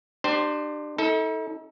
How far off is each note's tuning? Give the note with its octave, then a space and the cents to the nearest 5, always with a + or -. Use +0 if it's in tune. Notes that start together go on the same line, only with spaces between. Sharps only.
D4 +30 G4 -10 C5 -5
D#4 +45 A4 +0